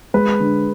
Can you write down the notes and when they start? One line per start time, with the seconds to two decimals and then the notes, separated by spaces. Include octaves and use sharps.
0.14 G#3 B4
0.40 D3